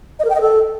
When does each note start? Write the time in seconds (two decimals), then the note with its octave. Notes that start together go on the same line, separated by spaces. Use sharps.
0.19 D#5
0.25 A#4
0.30 G5
0.35 D#5
0.41 A4